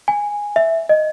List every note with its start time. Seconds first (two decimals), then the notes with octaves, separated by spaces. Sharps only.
0.08 G#5
0.56 E5
0.89 D#5